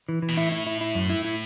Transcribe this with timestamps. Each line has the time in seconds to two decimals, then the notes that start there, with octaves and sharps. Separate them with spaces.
0.09 E3
0.22 E3
0.29 B2
0.37 A2 E4
0.52 E4
0.67 E4
0.81 E4
0.95 F#2
1.10 E4
1.25 E4